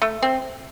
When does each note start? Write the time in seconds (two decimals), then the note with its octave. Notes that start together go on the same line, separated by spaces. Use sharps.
0.02 A3
0.23 C4